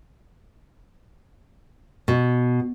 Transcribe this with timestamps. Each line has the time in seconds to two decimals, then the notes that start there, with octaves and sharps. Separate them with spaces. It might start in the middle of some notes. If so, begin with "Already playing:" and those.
2.08 B2